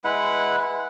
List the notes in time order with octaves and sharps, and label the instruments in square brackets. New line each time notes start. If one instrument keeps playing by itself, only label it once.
[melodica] G#3 E4 B4 F#5